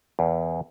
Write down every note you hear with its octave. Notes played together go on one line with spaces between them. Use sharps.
E2